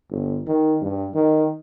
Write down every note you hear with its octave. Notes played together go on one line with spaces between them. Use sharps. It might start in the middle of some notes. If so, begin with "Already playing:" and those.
G1
D#3
G2
D#3